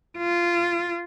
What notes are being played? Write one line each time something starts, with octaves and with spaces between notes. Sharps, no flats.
F4